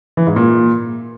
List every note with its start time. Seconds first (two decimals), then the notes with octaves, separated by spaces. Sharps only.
0.17 E3
0.27 G#2
0.36 A#2